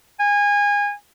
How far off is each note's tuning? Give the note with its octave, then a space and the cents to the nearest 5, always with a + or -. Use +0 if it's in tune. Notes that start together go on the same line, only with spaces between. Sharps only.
G#5 -25